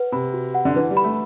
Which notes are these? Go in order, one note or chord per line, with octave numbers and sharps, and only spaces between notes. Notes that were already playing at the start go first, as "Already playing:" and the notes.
Already playing: B4 F#5
C3 B5
F#4
F#5
D3
E3 B4
G3
B5
A3